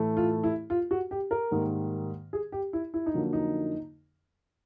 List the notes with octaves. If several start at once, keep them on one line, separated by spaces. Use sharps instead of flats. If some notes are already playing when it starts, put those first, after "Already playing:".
Already playing: A2 E3 A3
F4
E4
F4
F#4
G4
A#4
G#2 D#3 G3 A#3
G#4
G4
E4
E4
D#4
F2 D3 F#3 A#3
D#4